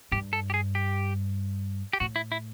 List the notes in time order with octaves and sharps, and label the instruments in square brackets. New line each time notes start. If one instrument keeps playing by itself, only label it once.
[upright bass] G2 [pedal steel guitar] G4
[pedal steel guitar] A4
G4
G#4
G4
G4
[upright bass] A2 [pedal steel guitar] F#4
[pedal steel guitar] E4
E4